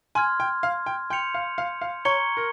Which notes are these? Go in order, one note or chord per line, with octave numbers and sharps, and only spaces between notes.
G#5 C6 F6 G#6
G5
F5
G5
G5 C6 G6 C#7 F7
F5
F5
F5
C#5 A#5 C#6 G#6 C#7 G7
A#4